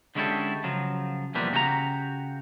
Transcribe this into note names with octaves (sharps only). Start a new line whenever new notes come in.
D3 G#3 C#4 E4 G4 A4
C#3 F3 F#3
E2 B2 F3 G3 A#3 B4
C#3 F#4 G4 C5 A#5